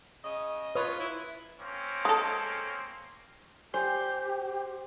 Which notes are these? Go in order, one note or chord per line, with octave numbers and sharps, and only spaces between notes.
C#3 D#5
F4 B4 C#5 D#6
E4
A#3 C4 C#4
G#3 A4
G4 C5 G5 G#5